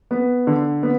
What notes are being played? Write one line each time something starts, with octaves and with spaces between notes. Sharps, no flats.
B3
D3
B3